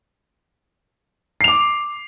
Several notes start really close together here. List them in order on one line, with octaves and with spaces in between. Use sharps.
C7 F7 D6